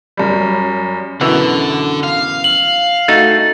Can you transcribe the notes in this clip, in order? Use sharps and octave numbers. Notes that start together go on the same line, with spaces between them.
F#2 G3
F#2 B2 D3 E3
F5
F#7
A3 D#4 F#4 A6